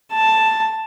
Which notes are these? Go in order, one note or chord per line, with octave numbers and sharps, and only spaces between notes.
A5